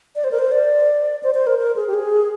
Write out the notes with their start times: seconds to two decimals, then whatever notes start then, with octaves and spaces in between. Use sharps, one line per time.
0.16 D5
0.24 C5
0.32 A#4
0.39 C5
0.52 D5
1.23 C5
1.34 C5
1.47 A#4
1.59 A#4
1.76 G#4
1.87 G4
1.94 G#4